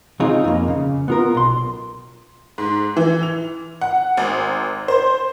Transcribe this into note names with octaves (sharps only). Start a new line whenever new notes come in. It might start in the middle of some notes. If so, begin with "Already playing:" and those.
C4 D#4 F4 G#4 C#5
F2 A#3
C#3
B3 F4 A#4
B1 C6
G#2
E3
F7
F#5
G#1
C5